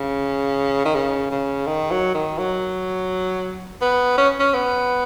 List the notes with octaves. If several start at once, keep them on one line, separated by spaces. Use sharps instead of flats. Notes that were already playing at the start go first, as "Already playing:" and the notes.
Already playing: C#3
D#3
C#3
C#3
D#3
F#3
D#3
F#3
B3
C#4
C#4
B3